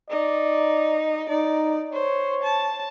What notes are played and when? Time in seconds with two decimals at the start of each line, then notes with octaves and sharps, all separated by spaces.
0.10 D#4 D5
1.29 D#4 D5
1.93 C5 C#5
2.44 A5